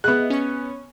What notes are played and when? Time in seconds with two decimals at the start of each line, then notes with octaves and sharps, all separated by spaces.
0.04 B3 G#4 D#5 E5 F#6
0.30 C#4 C#6